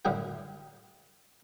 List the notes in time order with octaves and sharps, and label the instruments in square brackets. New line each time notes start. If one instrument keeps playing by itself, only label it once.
[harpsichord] F#2 A2 D3 A3 G#4 G5